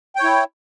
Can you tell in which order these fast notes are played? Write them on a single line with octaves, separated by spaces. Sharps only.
G5 C#5 E4